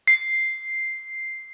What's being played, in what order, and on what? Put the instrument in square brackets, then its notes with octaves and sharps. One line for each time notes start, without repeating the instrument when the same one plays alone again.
[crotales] C7